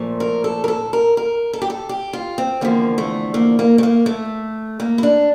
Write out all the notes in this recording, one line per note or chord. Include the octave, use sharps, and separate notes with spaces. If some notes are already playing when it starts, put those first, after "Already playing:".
Already playing: A#2 F3 A3
A#4
A4
A#4
A4
A#4
A#4
A4
G4
A4
G4
F4
C4
E2 D3 F3 A#3
A3
A#3
A#3
A3
A#3
A3
A#3
E4
D4